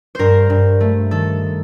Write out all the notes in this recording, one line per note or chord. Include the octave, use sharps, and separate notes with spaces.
G2 A#4 C5
G2
A3
D#3 A4